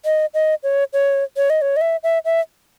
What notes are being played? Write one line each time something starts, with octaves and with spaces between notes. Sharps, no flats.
D#5
D#5
C#5
C#5
C#5
D#5
C#5
D#5
E5
E5
E5